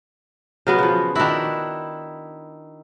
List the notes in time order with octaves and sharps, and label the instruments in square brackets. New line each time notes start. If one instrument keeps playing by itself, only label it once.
[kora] C#3 F#3 B3
C#3 F3
[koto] D#3 E4 [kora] D4 F#4